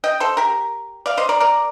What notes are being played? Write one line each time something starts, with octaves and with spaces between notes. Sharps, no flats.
D#5 G5
A4 C5
G4 A#4
D5 F5
C5 D#5
A#4 D5
A#4 D5